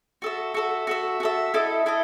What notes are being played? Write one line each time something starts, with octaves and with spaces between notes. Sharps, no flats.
F#4 A4 E5
F#4 A4 E5
F#4 A4 E5
F#4 A4 E5
E4 A4 D#5
E4 A4 D#5